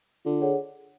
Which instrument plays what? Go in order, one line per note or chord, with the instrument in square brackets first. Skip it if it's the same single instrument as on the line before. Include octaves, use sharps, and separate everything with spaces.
[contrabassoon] D3 [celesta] F4
[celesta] G#4 C#5 F#5